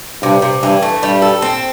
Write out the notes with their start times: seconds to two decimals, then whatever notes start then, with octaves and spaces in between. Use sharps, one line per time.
0.22 G2 C3
0.42 C3
0.62 G2 E3
0.82 A3
1.03 G2 G3
1.22 A4
1.42 C4